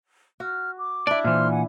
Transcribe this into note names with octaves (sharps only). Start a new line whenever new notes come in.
F#4 F6
D6
D4 E4 D5
A#2 E3 C5 C6 F6
F#5 G#5